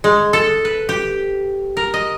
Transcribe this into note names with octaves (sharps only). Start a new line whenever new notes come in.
G#3
A4
B4
G4
A#4
D#5